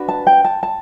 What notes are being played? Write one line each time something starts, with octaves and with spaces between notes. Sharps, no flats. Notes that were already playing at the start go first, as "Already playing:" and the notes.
Already playing: D4 F#4 B4
A5
G5
A5
A5